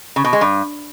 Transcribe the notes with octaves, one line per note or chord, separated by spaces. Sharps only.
C#3
B2
G#3
G2